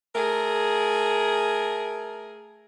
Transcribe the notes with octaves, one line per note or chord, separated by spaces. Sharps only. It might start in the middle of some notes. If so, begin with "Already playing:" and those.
A3 G#4 A#4